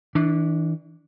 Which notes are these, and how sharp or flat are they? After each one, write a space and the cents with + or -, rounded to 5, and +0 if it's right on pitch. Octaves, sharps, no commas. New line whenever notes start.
E3 -30 D4 +0